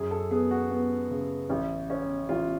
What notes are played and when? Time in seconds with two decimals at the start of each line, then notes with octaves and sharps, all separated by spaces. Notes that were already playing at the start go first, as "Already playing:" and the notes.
Already playing: F#2 G#4
0.11 A4
0.31 B3 G#4
0.51 F#4
0.70 B3
1.10 C#3
1.50 A1
1.90 C#4
2.29 A1 F4